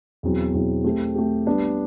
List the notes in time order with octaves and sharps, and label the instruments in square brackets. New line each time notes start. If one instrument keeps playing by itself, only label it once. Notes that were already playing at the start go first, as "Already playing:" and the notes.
[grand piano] E2 B2 F#3 C4 E4
E2 B2 F#3 C4 E4
A3 C4 G4
A3 C4 G4
G3 B3 D4